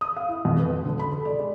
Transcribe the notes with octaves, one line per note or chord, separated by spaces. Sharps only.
D#6
F5
E4
F2
B4
E1
D3
B5
A4
D5
G#3